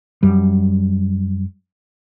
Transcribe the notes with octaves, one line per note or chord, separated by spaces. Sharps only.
F#2 G3